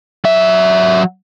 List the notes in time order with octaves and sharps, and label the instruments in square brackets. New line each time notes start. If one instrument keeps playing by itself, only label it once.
[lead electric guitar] F#3 E5